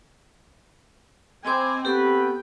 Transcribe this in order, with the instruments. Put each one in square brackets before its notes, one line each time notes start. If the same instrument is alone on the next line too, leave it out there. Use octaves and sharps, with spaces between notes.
[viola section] C4 G#5 [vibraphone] D#5 B5 D6
[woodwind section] B3 C4 [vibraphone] G4 A4 C#6 [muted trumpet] B4 [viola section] G5